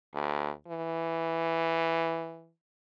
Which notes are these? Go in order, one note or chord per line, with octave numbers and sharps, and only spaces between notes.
D2
E3